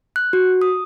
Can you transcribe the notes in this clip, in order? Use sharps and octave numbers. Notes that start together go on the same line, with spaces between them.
F#6
F#4
D#6